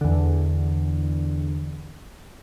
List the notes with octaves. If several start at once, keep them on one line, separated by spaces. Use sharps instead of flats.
E2 D3